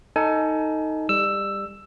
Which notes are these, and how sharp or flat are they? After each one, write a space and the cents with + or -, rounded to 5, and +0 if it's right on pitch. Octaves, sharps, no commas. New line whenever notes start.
D#4 +10 A4 +20 G#5 +30
G3 +25 E6 +10